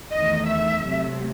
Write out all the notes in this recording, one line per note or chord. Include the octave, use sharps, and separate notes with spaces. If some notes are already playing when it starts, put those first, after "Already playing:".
E2 D#3 A3 D#5
E5
C3 F#3 A3 C4